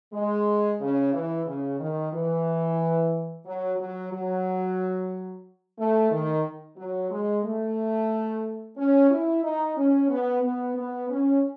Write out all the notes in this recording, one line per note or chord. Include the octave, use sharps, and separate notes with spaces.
G#3
C#3
E3
C#3
D#3
E3
F#3
F#3
F#3
A3
D#3
F#3
G#3
A3
C#4
E4
D#4
C#4
B3
B3
B3
C#4